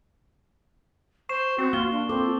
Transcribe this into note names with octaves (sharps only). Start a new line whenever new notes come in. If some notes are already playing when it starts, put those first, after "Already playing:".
C5 C#6 C7 E7
C4 F#4
A#3 F4 G7
D4
C4 A4 D6